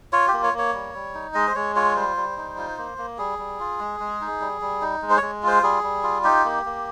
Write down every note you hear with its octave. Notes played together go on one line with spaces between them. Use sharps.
F4 C#5
G4
A#3
C#5
A#3
C#5
G3
G3
D#4
G#3 D#5
C5
G#3 C#5
F4 C#5
G3 C5
G3
D#4
F4
A#3
A#3
G3 G#4
G3
F4
G#3
G#3
D#4
G3
G3
D#4
G#3
C5
G#3 C#5
F4
C5
G3 G#4
G3
F4
D#4 G4
A#3
A#3